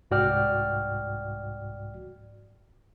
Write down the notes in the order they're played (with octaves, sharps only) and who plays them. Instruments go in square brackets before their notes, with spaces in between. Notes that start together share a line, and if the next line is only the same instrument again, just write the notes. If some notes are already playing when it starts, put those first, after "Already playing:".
[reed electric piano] C2 G#2 F#4 D5 G5 F6